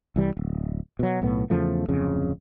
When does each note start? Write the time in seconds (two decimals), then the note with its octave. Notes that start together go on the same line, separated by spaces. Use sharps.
0.16 C2 E3 G3
0.37 D1
0.99 B2 F#3
1.22 B1 A2 B3
1.50 E2 C#3 F3 A3
1.89 D1 F2 C#3